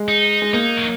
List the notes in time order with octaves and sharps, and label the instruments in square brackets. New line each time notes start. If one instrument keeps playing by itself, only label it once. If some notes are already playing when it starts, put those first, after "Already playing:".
Already playing: [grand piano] G#3
[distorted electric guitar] D#4
[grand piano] G#3
[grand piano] A#3 [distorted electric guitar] D#4
[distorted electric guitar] F#3